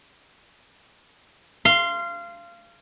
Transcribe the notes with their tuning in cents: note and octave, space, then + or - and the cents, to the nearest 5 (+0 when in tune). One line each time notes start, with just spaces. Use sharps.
F5 -25 C6 +0